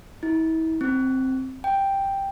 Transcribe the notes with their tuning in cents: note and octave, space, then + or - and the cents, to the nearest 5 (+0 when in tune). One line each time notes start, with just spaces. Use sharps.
E4 -40
C4 +5
G5 +0